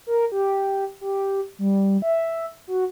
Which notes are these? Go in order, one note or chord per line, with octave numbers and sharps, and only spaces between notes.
A#4
G4
G4
G3
E5
F#4